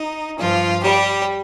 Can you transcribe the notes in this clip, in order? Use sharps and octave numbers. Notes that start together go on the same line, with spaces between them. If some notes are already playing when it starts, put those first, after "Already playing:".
Already playing: D#4
G2 F3 F4
G3 G4